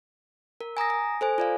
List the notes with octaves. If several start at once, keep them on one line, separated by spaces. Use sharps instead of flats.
A#4
G#5 A#5 D#6 A#6
G#5
A4 C5 G#5
F4 D5 F5